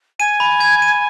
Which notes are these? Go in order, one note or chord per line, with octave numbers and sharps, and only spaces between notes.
G#5 D#7
B5
G#6
D#7